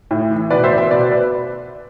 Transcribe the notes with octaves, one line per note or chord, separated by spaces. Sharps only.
A2
E3
B2 B4 D5
C5 E5
D5
C5 E5
B2 B4 D5
B4 D5